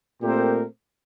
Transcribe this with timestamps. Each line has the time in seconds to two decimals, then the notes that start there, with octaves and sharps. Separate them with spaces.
0.21 A#2 A3 C4 G4 A#4